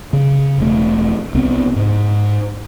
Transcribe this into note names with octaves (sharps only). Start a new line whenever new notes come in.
C#3
E1 A3
C2 B3 C4
G#2